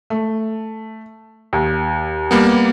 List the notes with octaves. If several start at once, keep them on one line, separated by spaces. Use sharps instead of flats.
A3
D#2
G3 A#3 B3